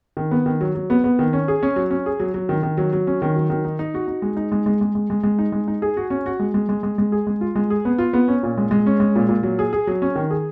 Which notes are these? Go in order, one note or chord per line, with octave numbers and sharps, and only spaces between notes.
D#3
B3
D#3
F#3
F#3
B3
B3
D#3
C#4
G#4
C#4
F#3
C#4
G#4
F#3
F#3
D#3
D#3
F#3
F#3
C#4
D#3
F#3
D#3
D#4
D#4
F#4
D#4
G#3
D#4
G#3
G#3
G#3
G#3
G#3
G#3
D#4
G#3
D#4
G#4
F#4
C#4
F#4
G#3
G#3
G#3
G#3
G#3
G#4
G#3
F4
G#3
G#4
B3
F4
B3
C#4
A#2
G#3
G#3
C#4
G#3
A#2
A#2
F#3
G#4
G#4
F#3
C#4
D#3
G#4